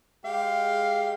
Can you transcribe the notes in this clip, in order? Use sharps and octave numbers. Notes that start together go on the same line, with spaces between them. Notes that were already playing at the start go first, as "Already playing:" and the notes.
G#3 G4 F5